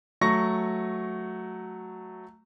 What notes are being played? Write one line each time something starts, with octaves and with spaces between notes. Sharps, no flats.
F#3 A3 C#6 A#6